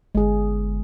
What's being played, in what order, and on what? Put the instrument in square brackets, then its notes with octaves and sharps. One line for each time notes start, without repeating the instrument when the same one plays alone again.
[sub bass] G1 [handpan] G#3 G#4